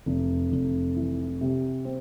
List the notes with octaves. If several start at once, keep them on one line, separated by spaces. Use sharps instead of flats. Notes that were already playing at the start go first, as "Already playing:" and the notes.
F1
F1
E3
C3
C4